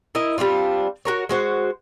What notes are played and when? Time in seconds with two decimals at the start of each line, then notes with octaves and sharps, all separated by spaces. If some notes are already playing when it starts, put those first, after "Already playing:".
0.15 E4 A#4 D#5
0.38 G3 C4 D4 F4
1.05 F#4 A#4 C#5
1.29 G#3 F#4 C5